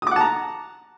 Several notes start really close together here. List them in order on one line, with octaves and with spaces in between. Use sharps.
D#6 D6 F#5 A5 A#5